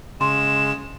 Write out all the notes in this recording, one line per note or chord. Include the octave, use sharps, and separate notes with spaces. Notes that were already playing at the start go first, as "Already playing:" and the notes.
C#3 G#3 C6 E7